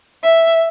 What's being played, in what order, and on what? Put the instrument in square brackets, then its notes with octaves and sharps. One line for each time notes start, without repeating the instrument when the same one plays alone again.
[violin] E5